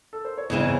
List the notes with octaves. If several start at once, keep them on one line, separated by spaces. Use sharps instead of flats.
A4
C5
C#5
E2 C#3 E3 C4 D#5
C#5